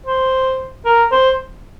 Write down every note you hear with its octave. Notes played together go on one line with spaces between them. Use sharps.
C5
A#4
C5